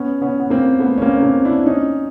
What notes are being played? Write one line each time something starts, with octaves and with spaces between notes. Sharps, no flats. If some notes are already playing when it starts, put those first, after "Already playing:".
Already playing: B3 C#4
B3 C#4
B3
A#3 C4
A3 B3
C#4
A#3 C4
C#4
A#3 C4
D4 E4
C#4 D#4